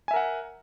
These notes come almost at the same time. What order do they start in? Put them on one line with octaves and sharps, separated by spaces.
G#5 E5 A#4 F#5